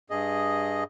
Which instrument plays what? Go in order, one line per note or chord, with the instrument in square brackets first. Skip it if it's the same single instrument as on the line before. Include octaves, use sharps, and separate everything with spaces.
[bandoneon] G2 G#4 D#5